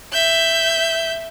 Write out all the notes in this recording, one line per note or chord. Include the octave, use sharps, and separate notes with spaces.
E5 G6